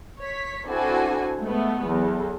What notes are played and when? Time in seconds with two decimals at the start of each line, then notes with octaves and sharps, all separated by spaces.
0.19 C#5 B6
0.66 C4 D4 E4 F#4 A4 G#5
1.40 G#3 A3 B3
1.86 E2 F#3 A4